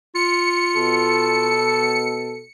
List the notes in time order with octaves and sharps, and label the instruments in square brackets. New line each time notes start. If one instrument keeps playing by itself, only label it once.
[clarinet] F4 [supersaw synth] C#7
[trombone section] B2 A4